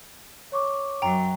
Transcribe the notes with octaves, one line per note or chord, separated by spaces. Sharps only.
C#5 C#6 D6
F#2 F#3 G5 A#5